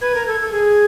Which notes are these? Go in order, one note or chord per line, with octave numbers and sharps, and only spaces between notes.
B4 G#6
A#4
A4 G#6
A4
G#4 G#6